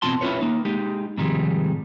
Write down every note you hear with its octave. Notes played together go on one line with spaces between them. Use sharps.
E2 B2 C4 F4 A5 C6
C#4 E4 F4 B4 C#5
A#3 D#4
G#3 D#4 G4
G#2 C3 D#3 F3 G3 G#3